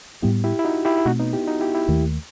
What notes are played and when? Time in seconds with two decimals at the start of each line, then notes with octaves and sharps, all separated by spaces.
0.22 A2 G3 B3 E4 G4
0.44 E4 G4
0.59 E4
0.64 D#4 F#4
0.85 E4 G4
0.98 E4
1.05 B2 A3 C4 D#4 F#4
1.20 B3 D#4
1.33 E4 G4
1.47 D#4 F#4
1.60 E4 G4
1.75 E4 G4
1.88 D#2 D#3 A3